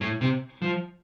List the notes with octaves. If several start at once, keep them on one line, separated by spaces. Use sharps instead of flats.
A2
C3
F3